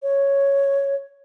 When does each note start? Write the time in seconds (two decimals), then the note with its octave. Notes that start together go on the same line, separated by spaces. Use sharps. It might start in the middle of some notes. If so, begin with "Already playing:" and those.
0.03 C#5